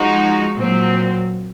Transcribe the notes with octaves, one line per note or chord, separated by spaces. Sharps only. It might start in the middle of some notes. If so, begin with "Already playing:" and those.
Already playing: F3 G#3 D#4 F#4
A#2 F#3 C4